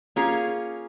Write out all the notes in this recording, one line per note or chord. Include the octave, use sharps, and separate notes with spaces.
A#3 C#4 F4 G#4 C#5